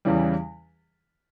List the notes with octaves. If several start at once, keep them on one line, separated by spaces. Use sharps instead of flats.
E2 C#3 E3 G3